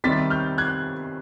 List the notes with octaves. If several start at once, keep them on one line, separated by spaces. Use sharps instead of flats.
C3 D#3 G3 C4 A6 B6
F6 G6
F#6 G#6